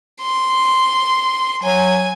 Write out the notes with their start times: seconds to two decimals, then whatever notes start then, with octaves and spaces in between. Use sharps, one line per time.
0.21 C6
1.63 F#3 G#5